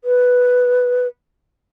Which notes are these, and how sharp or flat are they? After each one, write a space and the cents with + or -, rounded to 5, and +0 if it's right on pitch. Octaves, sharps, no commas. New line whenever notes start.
B4 +0